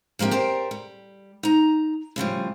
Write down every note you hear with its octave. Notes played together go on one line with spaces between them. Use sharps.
F3 A#3 C4 G4 E5
G4 A#4 C5 D5
G3
D#4 A#5
A2 C#3 F3 G3